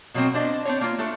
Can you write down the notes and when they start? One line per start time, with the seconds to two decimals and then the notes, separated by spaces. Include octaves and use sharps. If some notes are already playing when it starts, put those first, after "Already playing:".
0.14 B2 F#3 A#3 C4
0.34 C4 D4 D#5
0.65 C4 D4 C#5
0.81 A#3 F4
0.99 A3 D4 A4